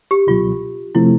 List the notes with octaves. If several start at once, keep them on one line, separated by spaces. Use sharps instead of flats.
G4
C#2 B2 F#3 F4
C3 F3 A3 C4 E4